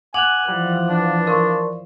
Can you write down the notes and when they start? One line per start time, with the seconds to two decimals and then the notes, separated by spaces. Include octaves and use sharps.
0.14 F#5 G#5 D6 F#6 F7 F#7
0.48 E3 F3 G3
0.89 D4
1.27 A#4 D5 C6 C#6